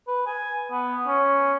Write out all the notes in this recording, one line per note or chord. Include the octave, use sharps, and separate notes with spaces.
B4
G#5
B3
C#4